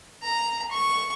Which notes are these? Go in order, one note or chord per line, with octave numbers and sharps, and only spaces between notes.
A#5
C#6